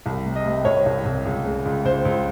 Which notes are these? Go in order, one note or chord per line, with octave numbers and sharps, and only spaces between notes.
C2
C3
D#5
C3
C2 C#5
C2
C2
C#2
C#3
C#2
C#2 C5
C#2